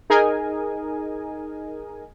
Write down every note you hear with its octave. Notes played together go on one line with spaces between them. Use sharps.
D#4 G#4 A#4 D#5 G#5